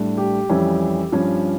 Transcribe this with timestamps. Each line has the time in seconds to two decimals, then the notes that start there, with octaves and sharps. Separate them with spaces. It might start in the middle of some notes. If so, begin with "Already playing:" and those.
Already playing: A2 G3 D4
0.18 G4
0.50 F2 E3 G3 C#4
1.12 G2 F3 C#4